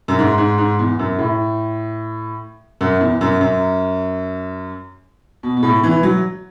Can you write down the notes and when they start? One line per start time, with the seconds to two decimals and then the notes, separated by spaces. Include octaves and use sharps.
0.08 F#2
0.19 G#2
0.38 G#2
0.58 G#2
0.79 E2
0.99 F#2
1.19 A2
2.81 F#2
3.01 E2
3.21 F#2
3.41 F#2
5.43 B2
5.57 B2
5.63 A2
5.83 E3
6.03 F#3